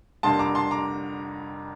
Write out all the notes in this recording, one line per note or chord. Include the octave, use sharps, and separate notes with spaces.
F1 F2 D3 G3 A#3 A5 C6
A#5 D6
A5 C6
A#5 D6